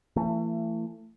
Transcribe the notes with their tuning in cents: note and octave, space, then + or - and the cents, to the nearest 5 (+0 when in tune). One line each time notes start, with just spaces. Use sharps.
E3 +30 A3 +35